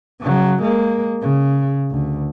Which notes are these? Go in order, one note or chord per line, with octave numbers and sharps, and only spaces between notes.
C#3 F#3
G#3 A#3
C#3
D2